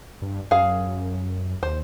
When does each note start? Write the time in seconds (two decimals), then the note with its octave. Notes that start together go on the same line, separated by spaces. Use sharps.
0.22 G2
0.51 F#2 G#4 F5
1.63 D#2 C5